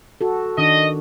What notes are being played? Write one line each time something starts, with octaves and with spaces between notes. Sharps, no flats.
F#4 A4
D#3 D4 D#5